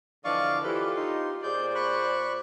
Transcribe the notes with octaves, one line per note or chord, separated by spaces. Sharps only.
D3 E3 F3 D4 D5 D#5 F5 C#6
E3 F4 G4 A4 B4 C5 D5
D#4 C6
A#2 G#4 C5 D5 G6
B5 C#6 F#6